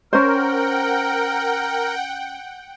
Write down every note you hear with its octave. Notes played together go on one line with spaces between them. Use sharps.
C#4 A#4 C5 F#5 G5